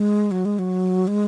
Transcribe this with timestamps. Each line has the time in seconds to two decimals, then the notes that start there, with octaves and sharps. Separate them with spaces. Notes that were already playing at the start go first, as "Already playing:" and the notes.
Already playing: G#3
0.31 F#3
0.45 G#3
0.59 F#3
1.08 G#3